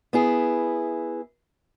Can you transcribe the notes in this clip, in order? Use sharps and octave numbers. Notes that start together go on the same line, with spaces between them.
B3 E4 G#4